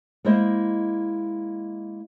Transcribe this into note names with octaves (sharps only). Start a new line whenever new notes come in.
G#3 A#3 E4 C5 D#5 E5